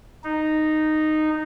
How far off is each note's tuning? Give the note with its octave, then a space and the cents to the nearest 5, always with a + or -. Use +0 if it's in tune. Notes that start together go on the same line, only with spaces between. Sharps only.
D#4 -10